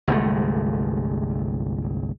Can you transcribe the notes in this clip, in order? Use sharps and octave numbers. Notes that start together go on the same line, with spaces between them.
G1 C2 G#3 A3